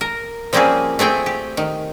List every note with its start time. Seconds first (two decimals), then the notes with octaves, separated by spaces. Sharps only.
0.01 A#4
0.53 F3 G3 A#3 C4 C#4 G#4
0.99 A3 C4 G#4 G5
1.26 G4
1.57 D#3